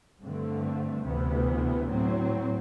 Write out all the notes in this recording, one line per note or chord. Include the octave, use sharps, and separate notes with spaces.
G2 D3 A3 C4
D2 C3 E3 B3
A2 F#3 C4